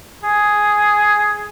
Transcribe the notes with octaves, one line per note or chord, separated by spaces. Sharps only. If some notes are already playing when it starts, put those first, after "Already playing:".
G#4